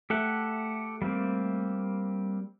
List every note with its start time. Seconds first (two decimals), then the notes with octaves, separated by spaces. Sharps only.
0.10 A3 G4 A4 F#5
1.02 G3 A#3 C4